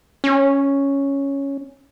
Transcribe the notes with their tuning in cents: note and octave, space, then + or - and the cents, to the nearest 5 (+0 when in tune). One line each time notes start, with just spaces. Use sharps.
C#4 +0